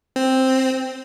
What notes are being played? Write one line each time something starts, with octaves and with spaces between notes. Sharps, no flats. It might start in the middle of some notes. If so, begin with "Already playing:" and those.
C4